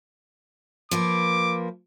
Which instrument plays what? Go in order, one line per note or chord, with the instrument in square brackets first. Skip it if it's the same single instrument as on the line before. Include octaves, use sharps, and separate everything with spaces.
[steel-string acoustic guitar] F3 A#3 B4 [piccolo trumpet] D6